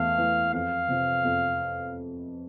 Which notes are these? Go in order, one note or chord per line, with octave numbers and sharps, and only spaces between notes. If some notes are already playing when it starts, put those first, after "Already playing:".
Already playing: E2 E3 A3 F5
E3 A3
F2 F5
C3 F3 C4
F2